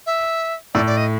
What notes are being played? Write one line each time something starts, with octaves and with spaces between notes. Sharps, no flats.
E5
A2 D5
D5
D#5